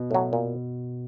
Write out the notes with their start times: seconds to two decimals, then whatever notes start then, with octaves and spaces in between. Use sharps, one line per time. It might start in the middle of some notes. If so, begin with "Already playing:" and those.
Already playing: B2
0.11 A2 F#3
0.33 A#2